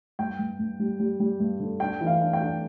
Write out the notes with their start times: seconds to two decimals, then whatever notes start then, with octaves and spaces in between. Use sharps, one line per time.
0.19 G2 G5
0.39 G2
0.59 G2
0.79 G3
1.00 G3
1.20 G3
1.40 G2
1.60 D3
1.80 D4 G5
2.01 E3
2.07 F5
2.21 D4
2.33 G5
2.41 D4